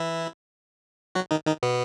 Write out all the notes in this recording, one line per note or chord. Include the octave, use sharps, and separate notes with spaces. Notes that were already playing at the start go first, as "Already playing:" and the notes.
Already playing: E3 E4
F#3 F#4
D#3 D#4
D#3 D#4
B2 B3